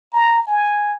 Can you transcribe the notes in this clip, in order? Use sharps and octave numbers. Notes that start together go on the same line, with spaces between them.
A#5
G#5